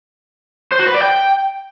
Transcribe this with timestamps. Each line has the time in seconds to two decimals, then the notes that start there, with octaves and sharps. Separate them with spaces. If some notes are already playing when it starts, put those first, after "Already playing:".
0.72 C5
0.80 F#4
0.87 B4
0.95 D5
1.02 G5